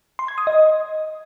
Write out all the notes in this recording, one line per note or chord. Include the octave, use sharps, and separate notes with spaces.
C6
G#6
D#6
D#5